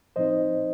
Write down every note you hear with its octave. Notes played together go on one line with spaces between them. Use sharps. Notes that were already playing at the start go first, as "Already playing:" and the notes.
A#2 F3 C4 D#4 C5 D#5